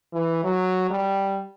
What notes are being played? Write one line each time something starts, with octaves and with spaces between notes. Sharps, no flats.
E3
F#3
G3